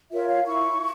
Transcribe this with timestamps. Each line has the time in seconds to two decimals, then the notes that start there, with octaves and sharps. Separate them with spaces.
0.11 F4 A#4 C#5 E5
0.29 F5
0.46 E4 C#6